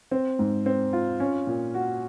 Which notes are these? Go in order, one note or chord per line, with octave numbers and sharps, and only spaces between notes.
C4
G#2
C4
F4
C#4
A#2
F#4